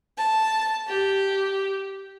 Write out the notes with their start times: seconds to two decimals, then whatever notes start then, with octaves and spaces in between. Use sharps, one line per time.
0.18 A5
0.87 G4